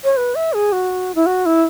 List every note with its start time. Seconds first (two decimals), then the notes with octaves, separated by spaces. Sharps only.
0.04 C#5
0.17 B4
0.35 E5
0.53 G#4
0.72 F#4
1.15 E4
1.26 F#4
1.46 E4